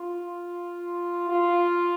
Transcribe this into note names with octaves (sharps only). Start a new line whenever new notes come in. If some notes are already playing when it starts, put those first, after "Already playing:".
Already playing: F4
F4